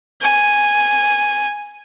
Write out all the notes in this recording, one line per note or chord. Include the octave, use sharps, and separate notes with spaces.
G#5